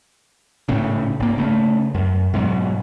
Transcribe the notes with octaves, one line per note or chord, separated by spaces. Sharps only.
G#1 A2 C#3
G#1 A#3
C#3 A3
F#2
G#2 B2 F#3